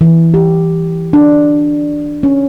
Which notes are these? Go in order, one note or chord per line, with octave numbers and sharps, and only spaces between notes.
E3
G4
D4
C#4